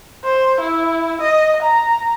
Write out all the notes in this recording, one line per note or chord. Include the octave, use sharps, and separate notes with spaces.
C5
E4
D#5
A#5